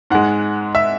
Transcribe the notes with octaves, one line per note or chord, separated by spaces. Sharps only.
G#2 G#3 F#5
E5